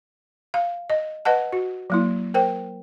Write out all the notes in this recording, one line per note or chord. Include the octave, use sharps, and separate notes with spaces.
F5
D#5
B4 D#5 F#5 A5
F#4
F#3 A#3 E4
A#4 C5 G5